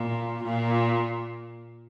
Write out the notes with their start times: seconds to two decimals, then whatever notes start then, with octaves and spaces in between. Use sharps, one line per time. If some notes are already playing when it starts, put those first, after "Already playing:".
Already playing: A#2
0.44 A#2